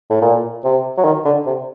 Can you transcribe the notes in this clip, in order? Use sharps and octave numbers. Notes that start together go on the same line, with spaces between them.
A2
A#2
C3
F#3
D#3
D3
C3